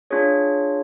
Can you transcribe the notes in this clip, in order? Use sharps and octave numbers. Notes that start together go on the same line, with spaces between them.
D4 F4 G#4 C#5